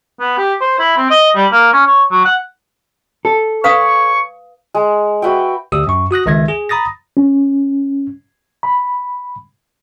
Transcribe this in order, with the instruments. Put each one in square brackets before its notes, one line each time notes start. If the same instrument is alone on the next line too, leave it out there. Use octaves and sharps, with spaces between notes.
[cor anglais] B3
G4
C5
E4
C4
D#5
G3
A#3
C#4
C#5
F#3
F#5
[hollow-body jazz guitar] A4
[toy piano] B4 F5 D#6 [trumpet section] C#5 C#6
[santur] G#3
F#4 B4 E5 G5
[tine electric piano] D2 G4 D#6 E6
F#2 C#6
F#4 D#6 F#6 A#6
C#2 D#3 E5 G#6 A#6
G#4
A#5 B5 D#6 A6 A#6
[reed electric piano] C#4
B5